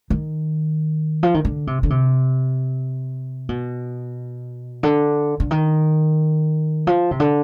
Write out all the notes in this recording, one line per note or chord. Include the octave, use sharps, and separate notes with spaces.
D#3
F3
D#3
D3
C3
D3
C3
B2
D3
D3
D#3
F3
C3
D3